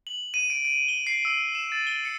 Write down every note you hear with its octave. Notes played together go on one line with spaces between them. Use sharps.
F#7
D#7
D7
D7
G7
C7
E6
E7
A6
G7
C#7